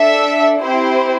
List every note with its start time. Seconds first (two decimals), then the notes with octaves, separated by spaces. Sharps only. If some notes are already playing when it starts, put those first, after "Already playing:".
Already playing: D4 A4 E5
0.62 C4 E4 G4 C5